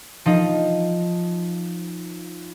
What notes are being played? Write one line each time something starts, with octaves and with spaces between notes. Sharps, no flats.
F3 D#4